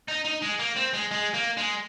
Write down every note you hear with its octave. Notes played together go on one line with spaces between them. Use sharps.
D#4
D#4
G#3
A#3
C4
G#3
G#3
A#3
G#3